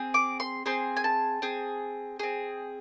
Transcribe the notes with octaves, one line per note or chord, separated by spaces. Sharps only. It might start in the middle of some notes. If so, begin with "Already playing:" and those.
Already playing: C4 G#4
D6
C6
C4 G#4 C6
G#5
A5
C4 G#4
C4 G#4